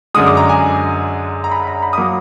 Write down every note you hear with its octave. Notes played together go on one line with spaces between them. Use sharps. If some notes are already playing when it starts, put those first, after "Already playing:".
F#2 D3 G#3 D#6
D6
A#5
G#5
A#5
B5
A#5
B5
D#6
F#3 A#3 D6